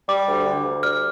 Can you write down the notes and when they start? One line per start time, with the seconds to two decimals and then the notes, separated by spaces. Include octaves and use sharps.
0.09 G3 D6
0.28 D2
0.45 D2
0.65 D2
0.83 G3 F6